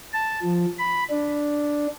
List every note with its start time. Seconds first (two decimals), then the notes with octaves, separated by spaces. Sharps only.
0.13 A5
0.43 F3
0.79 B5
1.10 D4